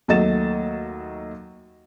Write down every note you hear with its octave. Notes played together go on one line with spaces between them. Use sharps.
D#2 F#3 A3 D#5 A6 E7